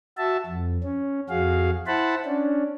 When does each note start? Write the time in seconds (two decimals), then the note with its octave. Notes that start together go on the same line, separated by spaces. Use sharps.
0.18 F#4 E5 A5
0.46 F2
0.84 C#4
1.29 F2 F#4 G#4 F5
1.87 E4 C5 F#5 A5 B5
2.26 C#4 D4